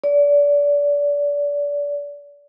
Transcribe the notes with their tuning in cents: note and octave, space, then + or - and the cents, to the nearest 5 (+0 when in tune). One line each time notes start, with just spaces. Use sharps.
D5 -30